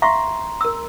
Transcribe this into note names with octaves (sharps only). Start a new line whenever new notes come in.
E5 F5 A#5 C6 C#6
A#4 E6